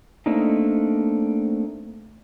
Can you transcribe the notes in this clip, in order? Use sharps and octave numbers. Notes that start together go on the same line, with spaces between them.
A3 A#3 C4 D4 D#4